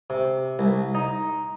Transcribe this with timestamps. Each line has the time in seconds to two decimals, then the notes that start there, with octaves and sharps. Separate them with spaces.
0.10 C3
0.59 C2
0.95 D#4